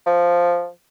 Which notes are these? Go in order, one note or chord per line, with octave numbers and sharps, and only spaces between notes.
F3